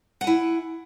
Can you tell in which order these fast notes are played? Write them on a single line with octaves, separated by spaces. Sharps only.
F#5 G#5 E4